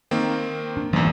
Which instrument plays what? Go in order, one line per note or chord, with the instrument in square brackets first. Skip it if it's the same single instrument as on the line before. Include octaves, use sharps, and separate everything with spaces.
[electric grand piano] D#3 A#3 C4
[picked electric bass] D4
[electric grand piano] G#1 E2 [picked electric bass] E3 F#3 A#3